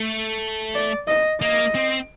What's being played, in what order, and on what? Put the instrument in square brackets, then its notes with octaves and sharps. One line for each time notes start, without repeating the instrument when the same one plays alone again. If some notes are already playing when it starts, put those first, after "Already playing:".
Already playing: [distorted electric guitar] A3
[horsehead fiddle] D5
D#5
[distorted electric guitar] A#3 [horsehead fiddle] D#5
[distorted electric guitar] C4